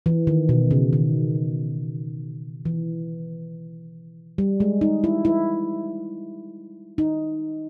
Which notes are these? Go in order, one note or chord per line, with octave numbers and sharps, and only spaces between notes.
E3
D#3
B2
C#3
D#3
E3
G3
G#3
D#4
E4
E4
D#4